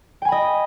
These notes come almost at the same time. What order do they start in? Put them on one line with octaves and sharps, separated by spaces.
G5 G#5 B5 D#5